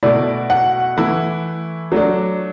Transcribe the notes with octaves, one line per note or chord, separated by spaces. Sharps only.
B2 A3 E4 D5
F#5
E3 A3 E4
F#3 A3 D4